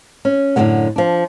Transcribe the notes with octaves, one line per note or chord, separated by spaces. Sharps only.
C#4
F#2 A2 D3 E3 G#3 F#5
F3 D4